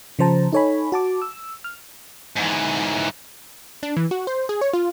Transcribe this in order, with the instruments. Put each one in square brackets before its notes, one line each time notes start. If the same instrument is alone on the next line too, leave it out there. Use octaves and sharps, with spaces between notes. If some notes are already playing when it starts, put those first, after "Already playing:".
[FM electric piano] C#3 F3 C5 A5 A#5
D#4 A4 C#5 G#5 B5
F#4 A5 D6
E6
F6
[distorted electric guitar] G#2 E3
[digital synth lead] D4
E3
F#4
C5
G#4
C#5
F4